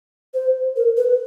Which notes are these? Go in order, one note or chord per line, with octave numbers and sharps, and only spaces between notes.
C5
A#4
B4